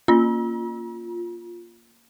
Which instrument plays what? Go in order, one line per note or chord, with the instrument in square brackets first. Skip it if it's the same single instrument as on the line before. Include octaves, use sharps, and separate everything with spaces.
[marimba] A#3 C#4 [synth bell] F4